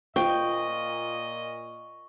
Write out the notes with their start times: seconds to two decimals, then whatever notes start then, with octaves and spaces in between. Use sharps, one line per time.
0.16 A#2 F4 C5 D#5 G5 C#6